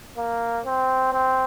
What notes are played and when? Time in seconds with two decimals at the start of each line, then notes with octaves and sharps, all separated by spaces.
0.18 A#3
0.66 C4
1.13 C4